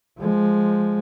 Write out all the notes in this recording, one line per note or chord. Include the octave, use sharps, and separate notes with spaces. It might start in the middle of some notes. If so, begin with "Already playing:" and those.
F3 G#3